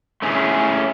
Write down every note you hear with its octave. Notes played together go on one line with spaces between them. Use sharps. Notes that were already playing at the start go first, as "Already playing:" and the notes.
A3 C#4 E4 G#4